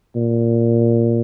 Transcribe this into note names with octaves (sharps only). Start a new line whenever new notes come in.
A#2